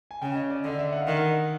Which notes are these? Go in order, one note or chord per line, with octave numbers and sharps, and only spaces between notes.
G#5
C#3 G5
D#5
D5
D3 D#5
E5
F#5
F5
D#3 F#5